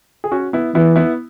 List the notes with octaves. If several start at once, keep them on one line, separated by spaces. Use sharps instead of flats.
G#4
C#4 F#4
B3 E4
E3 B3 E4
B3 E4